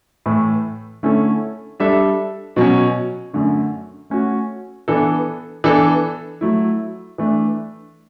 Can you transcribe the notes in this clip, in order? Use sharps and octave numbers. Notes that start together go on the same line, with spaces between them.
A2 E3 A3
D3 A3 C#4 E4 A4
G3 D4 A4 E5
B2 F#3 C#4
F#2 D3 A3
A3 C#4 F#4
E3 B3 D4 A4
E3 B3 D4 A4
F#3 A3 E4
E3 A3 D4